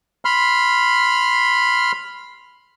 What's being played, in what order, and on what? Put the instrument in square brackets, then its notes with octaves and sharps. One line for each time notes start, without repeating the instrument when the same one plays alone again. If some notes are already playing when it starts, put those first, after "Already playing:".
[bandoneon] B5 C6 F6